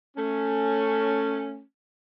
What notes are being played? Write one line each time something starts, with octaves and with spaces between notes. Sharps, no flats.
A3 C#4